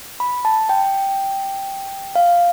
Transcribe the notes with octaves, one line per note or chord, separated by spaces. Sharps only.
B5
A5
G5
F5